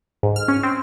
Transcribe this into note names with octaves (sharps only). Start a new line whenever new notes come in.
G#2
F6
C#4
C4